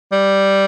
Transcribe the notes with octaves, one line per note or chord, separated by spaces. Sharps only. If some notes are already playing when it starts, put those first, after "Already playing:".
G3